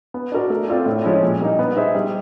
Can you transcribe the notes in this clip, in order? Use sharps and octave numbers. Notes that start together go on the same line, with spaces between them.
B3
D4 F#4 A#4 D5
A3
C4 F4 A4 D5
A2
F3 G#3 C#4 E4
A#2
G3 A#3 D#4
B3
D#4 G#4 C5 E5
G3